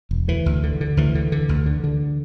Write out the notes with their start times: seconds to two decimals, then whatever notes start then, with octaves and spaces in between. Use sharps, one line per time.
0.11 E1
0.28 D2 E3
0.46 D2
0.63 D3
0.81 D3
0.97 D2 E3
1.15 D3
1.32 D3
1.49 D2
1.66 D3
1.84 D3